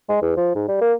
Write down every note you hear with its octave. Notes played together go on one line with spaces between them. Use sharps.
G#3
E2
F3
G#2
G3
A#3